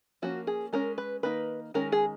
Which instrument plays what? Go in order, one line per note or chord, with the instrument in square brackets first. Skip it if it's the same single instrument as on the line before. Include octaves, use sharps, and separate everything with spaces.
[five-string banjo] F3 A#3 C#4 F#4
G#4
G#3 C#4 A#4
B4
D#3 A#3 D#4 B4
D#3 G#3 C#4 A#4
G#4